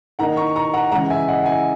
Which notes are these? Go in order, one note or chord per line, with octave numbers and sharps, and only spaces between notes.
D#3 A#3 D#4 F#5 A#5
A#5 C#6
A#5 C#6
F#5 A#5
C#3 E3 G#3 F#5 A#5
E5 G#5
D#5 F#5
F#5
E5 G#5